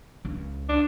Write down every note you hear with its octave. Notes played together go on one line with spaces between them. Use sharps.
C#2
D4